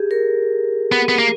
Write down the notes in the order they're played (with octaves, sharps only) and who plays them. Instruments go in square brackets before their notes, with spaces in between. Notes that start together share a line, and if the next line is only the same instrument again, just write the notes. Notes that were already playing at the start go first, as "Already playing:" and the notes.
Already playing: [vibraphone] G4 G#4
A#4
[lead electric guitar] B3
B3
A#3